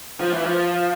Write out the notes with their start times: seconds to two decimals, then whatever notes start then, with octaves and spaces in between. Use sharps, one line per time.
0.21 F3
0.33 E3
0.45 F3